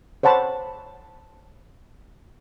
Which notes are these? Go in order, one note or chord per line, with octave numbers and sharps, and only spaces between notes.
C5 C#5 F#5 A5 B5